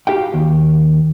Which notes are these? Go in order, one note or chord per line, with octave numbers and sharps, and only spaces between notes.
F#4 G4 F5 G5
D#2